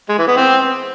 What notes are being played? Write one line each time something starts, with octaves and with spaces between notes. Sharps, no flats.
G#3
E3
B3
C4